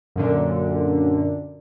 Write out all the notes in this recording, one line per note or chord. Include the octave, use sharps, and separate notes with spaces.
F#2 A#2 D3